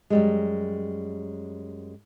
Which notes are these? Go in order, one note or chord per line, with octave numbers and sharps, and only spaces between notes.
F#2 G3 G#3